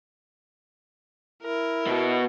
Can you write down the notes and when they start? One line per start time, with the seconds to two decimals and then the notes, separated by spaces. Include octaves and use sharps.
1.43 E4 A#4
1.87 B2 F#4